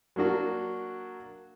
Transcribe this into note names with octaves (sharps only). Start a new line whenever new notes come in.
F#3 A#3 D4 F#4